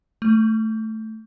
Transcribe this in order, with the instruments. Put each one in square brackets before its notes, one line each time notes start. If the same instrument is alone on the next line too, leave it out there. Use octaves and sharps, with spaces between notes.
[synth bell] A3